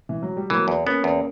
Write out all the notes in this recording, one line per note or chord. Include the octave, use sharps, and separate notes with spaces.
E3
F#3
G3
E3 F#3 A#3
E2
A#3 B3 C#4
E2